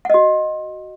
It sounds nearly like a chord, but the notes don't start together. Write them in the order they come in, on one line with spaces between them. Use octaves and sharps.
F#5 D#5 F#4